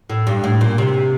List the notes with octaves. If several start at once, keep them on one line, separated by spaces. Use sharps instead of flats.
A2
G2
A2
A#2
C3